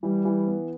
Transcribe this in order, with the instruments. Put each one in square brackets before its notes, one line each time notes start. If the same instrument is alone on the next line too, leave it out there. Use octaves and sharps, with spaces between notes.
[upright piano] E3 [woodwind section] G3
[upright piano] E3
B3